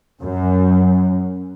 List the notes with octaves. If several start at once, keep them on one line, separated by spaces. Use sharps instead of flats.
F#2